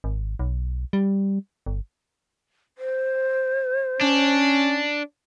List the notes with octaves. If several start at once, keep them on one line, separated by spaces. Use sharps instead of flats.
G#1
B1
G3
G1
C5
C#4 D4